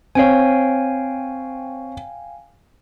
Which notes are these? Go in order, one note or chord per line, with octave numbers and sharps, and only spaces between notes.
C4 C#5 F5 G5 G#5